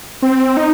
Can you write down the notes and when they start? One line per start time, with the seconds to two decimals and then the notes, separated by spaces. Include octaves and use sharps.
0.22 C4
0.57 D#4